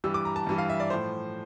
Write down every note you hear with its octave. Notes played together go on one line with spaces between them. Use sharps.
G2 E3 G3 E6
D6
A#5
A5
G2 E3 G3
F5
E5
D5
A2 F3 C5